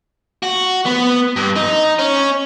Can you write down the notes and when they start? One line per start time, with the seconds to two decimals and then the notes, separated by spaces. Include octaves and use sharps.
0.43 F#4
0.86 B3
1.36 G2
1.56 D#4
1.99 C#4